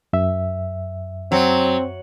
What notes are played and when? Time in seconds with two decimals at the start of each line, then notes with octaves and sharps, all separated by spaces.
0.13 F#2 E5
1.32 F#3 C4